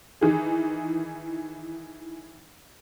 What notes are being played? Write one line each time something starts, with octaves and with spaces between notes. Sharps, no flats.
D#3 E3 G#4